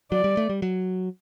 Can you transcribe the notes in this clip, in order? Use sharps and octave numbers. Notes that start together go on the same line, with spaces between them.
F#3 D5
G3
A3
G3
F#3